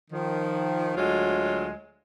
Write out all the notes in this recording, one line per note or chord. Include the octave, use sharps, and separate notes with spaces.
D#3 F3
D2 F#3 G#3 F4